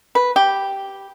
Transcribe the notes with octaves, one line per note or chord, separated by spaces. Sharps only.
B4
G4